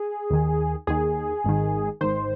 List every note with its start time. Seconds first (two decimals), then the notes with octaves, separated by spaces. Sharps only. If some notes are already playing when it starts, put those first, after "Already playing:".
Already playing: G#4
0.30 D#2 D#3
0.87 D#2 D#3 G#4
1.44 G#1 G#2 D#3
2.01 G#1 G#2 D#3 C5